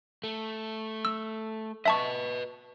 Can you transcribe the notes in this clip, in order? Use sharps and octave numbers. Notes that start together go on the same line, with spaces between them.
A3
E6
B4 D#5 E5 A5 C#6